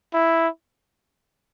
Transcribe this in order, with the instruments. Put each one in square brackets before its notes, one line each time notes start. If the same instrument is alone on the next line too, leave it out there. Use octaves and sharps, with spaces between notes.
[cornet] E4